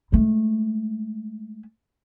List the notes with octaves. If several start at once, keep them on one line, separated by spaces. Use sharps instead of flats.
G#3 A3